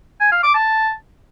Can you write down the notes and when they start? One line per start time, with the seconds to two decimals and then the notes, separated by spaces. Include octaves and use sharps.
0.20 G#5
0.31 F5
0.43 D6
0.54 A5